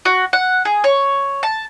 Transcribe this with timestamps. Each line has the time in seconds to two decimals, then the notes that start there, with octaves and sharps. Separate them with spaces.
0.05 F#4
0.33 F#5
0.65 G#4
0.84 C#5
1.43 A5